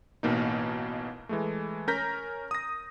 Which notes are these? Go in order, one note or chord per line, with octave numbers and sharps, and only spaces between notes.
A1 B2 A#3 D#4
E3 G#3 A3
C#4 A#4 A#5 G6 A#6 B6
D#6 A#6